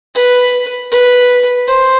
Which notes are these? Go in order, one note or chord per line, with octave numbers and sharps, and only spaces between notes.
B4
B4
C5